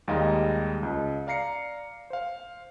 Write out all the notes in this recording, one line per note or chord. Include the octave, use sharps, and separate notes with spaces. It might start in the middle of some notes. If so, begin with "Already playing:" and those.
D#2 G3 G#3 D#5 F5 A#5
C#2 D#5
D5 F5 A#5 C7 C#7
C5 F5